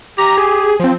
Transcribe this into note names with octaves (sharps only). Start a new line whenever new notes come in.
G4 A#5
G#4
F3 C4